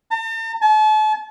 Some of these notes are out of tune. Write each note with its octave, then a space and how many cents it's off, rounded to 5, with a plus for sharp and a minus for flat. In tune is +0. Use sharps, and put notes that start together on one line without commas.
A5 +45
A5 -40